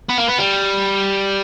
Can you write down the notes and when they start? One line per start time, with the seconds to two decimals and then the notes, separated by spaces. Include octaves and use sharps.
0.09 B3
0.18 A#3
0.28 B3
0.39 G3